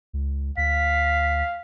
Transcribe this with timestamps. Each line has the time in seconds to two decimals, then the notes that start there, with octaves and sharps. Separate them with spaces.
0.13 C#2
0.57 D2 F5 B6